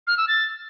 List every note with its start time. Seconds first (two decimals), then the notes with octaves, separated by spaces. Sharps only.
0.07 F6
0.18 E6
0.28 A6